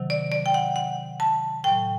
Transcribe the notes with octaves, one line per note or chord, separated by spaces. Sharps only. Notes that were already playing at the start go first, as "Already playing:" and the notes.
Already playing: C3 D#3 F#3
D5
D5
G5
F#5
F#5
A5
A2 F#3 G5